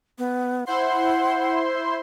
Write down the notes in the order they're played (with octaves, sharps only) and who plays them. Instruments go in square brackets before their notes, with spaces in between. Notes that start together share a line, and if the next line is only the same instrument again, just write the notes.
[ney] B3
[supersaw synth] E4 C5 C6 [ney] F#5